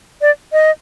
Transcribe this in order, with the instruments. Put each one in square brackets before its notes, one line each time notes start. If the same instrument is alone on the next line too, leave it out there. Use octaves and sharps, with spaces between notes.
[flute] D5
D#5